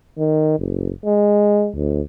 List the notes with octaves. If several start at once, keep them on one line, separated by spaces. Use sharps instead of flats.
D#3
F#1
G#3
D2